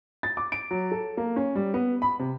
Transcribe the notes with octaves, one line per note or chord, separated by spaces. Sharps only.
A6
D6
D7
F#3
A4
A#3
C#4
G3
B3
B5
C3